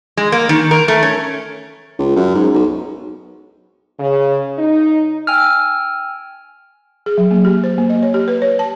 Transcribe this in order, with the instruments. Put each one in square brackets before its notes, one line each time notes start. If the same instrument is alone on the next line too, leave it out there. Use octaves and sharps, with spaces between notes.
[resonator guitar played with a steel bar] G#3
A#3
D#3
A#4
A3
C#4
[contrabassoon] C#2
F#2
G#2
B1
[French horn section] C#3
D#4
[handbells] G5 G#5 E6 F6
[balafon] G#4
F#3
A#3
G4
C5
A#3
D#5
C#5
G4
B4
C#5
A5